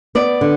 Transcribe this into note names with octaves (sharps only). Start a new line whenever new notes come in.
B3 D5
D3